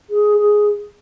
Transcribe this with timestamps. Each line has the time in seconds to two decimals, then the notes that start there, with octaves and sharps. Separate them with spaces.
0.10 G#4
0.37 G#4